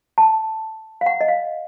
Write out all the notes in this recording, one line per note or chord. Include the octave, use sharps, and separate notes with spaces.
A5
F5
F#5
D#5
F5